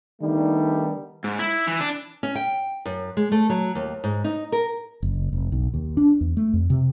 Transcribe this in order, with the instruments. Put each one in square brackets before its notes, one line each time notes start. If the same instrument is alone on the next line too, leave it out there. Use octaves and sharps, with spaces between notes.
[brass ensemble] D#3 G3 A3 B3 D4 D#4
[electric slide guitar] G#2
E4
E3
D4
[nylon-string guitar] C#4
G5
F#2
G#3
A3
F#3
D#2
G#2
D#4
A#4
[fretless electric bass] F#1
F1
B1
D#2
D4
E2
A3
F2
C3